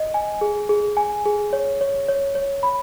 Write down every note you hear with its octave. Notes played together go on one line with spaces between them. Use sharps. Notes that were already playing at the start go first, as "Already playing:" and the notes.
Already playing: D#5
G#5
G#4
G#4
G#5
G#4
C#5
C#5
C#5
C#5
B5